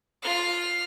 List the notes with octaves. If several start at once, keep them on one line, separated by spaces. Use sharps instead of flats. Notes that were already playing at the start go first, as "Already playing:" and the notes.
F4 F6